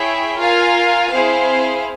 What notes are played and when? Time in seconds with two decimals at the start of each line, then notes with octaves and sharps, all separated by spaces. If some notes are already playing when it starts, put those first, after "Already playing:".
Already playing: E4 G#4 C#5 E5 G5
0.36 F4 A#4 F5 G#5
1.10 C4 E4 G#4 C5 F5